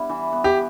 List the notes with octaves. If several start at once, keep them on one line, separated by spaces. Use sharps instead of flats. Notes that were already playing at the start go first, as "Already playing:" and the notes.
Already playing: G3 B3 D4 E4
E3
B3
G4